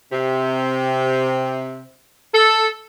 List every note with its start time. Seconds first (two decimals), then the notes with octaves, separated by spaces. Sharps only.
0.12 C3
2.34 A4